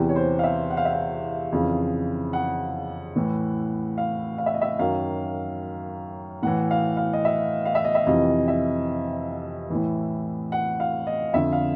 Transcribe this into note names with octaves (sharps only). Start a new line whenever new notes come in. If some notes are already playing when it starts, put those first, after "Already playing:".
Already playing: E2 C3 E3 G4
C#5
C5
F5
E5
F#5
F5
E5
F5
F2 C#3 E3
F#5
A2 E3
F5
F5
E5
D#5
E5
F#2 D#3 F5
A2 E3 F#5
F5
F5
D#5
E5
F5
E5
D#5
E5
F2 C3 E3 D#5
E5
A2 E3
F#5
F5
D#5
F2 D3 E5
F5